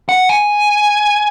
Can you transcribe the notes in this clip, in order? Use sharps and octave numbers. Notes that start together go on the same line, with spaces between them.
F#5
G#5